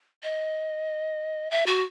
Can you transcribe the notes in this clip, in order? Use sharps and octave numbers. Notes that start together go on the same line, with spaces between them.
D#5
E5
F#4